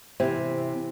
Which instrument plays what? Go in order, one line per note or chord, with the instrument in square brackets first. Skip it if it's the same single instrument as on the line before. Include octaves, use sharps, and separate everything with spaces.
[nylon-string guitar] C3 [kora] E3 C4 [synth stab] C5